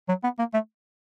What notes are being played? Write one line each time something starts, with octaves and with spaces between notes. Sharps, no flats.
F#3
B3
A#3
A3